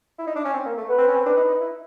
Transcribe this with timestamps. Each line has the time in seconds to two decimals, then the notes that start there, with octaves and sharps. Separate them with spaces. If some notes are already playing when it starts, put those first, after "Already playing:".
0.19 E4
0.27 D#4
0.36 D4
0.45 C#4
0.54 C4
0.66 A#3
0.78 A3
0.89 B3 B4
0.98 C4
1.08 C#4
1.16 C4
1.26 D4 B4
1.37 D#4
1.48 D#4
1.61 E4